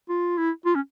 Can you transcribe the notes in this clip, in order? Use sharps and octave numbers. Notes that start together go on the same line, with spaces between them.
F4
E4
F4
C#4